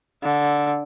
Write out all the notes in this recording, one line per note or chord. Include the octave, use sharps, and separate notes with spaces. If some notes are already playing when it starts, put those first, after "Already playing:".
D3